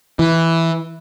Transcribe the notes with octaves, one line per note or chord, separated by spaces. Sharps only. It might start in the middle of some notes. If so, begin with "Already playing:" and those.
E3